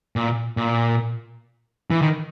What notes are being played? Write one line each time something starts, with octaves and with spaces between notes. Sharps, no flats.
A#2
A#2
E3
D#3